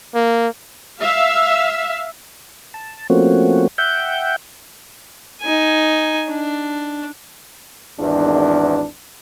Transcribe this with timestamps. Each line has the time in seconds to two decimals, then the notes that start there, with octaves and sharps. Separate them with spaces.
0.15 A#3
1.00 E5 F5
2.74 A5
3.10 F3 A3 A#3 C4 C#4 F#4
3.78 E5 F#5 G5 G6
5.41 D#4 G#5
6.29 D4
8.00 G#1 E2 D4